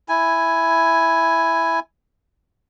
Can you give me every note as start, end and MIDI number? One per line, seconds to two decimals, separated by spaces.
0.09 1.80 64
0.09 1.80 80